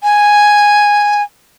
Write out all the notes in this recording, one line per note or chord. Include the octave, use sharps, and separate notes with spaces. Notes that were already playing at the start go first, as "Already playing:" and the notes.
G#5